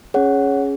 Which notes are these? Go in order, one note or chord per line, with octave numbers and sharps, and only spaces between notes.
C#4 G#4 C#5 F#5